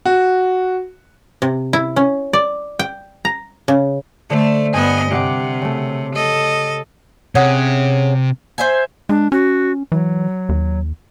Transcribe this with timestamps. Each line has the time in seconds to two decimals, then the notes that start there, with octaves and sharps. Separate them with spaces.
0.05 F#4
1.42 C3
1.73 E4
1.96 C#4
2.33 D5
2.79 G5
3.25 A#5
3.68 C#3
4.30 D3 A3 C5
4.73 G2 B3 D#5 G#5 G6
5.11 C3 G4 F#5 D6
5.62 C#3 A3
6.15 A4 D#5
7.35 C3 C#4 G#4 F#5
8.58 C5 E5 G#5
9.09 G#3 D4
9.32 C#4 F#4
9.92 E3 F#3
10.49 D#2